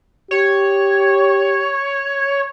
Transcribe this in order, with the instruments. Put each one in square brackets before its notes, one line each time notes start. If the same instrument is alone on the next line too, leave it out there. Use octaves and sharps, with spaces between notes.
[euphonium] G4 [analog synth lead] C#5